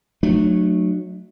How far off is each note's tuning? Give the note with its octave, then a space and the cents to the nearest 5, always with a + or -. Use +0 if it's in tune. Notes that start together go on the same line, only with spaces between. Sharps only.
F#3 -10 A3 +0 D4 +45